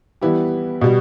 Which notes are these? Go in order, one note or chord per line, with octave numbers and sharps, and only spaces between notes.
E3 G3 B3 E4 G4
B2 G3